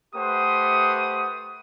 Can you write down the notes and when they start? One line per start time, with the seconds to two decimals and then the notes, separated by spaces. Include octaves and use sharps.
0.15 A3 G4 B4 C5 F#5 D#6